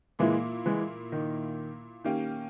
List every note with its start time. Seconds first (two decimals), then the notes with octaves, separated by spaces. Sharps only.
0.19 A#2 E3 G#3 A#3 E4
0.66 E3 G#3
1.12 D#3
2.04 D#3 A#3 C#4 G4